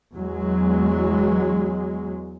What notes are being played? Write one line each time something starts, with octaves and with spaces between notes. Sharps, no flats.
E2 F#3 G#3